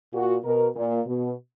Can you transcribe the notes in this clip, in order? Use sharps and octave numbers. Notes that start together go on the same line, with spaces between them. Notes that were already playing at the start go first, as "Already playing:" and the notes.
A#2 F#4
B2 A#4
A#2
B2